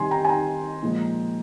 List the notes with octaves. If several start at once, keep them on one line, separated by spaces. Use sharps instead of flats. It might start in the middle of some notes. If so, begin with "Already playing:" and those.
Already playing: C3 D#3 G3 G#5 C6
G5 A#5
G#5
G5 A#5
A#2 F3 G#3